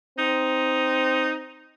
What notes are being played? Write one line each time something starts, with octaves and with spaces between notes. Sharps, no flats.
C4 D#4